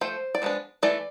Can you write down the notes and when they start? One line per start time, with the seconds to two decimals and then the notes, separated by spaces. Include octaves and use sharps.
0.01 F3 A3 C5
0.35 D5
0.42 F3 G#3 B3 D4
0.83 E3 A3 D5